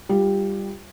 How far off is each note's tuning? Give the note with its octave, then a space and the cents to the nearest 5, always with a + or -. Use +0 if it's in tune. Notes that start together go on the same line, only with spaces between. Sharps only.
G3 +5 F4 +0